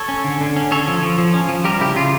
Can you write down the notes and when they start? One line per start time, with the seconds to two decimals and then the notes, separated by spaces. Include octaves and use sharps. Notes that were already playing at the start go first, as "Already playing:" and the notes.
Already playing: A4 C#5
0.09 C#4
0.24 D3
0.41 D3
0.56 C#4
0.71 C#4 A4 C#5
0.88 F3
1.03 F3
1.18 F3
1.34 C#4
1.49 F3
1.64 G3 G4 A#4
1.81 C#3 E4 G4
1.96 C#3 F4